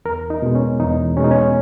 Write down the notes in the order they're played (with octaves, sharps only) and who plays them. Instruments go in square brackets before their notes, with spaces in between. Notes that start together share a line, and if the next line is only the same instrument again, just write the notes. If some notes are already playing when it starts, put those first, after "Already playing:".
[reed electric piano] E2 A#4
D#4
B2 G#3
C#4
E2 D#4
B2 G#3 C#4
D#4
C#4